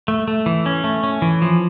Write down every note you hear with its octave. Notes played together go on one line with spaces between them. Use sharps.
A3
A3
E3
C#4
A3
C#4
E3
F3